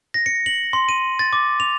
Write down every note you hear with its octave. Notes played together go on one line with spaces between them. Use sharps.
A#6
C#7
F#7
C6
D#7
A6
D6
F7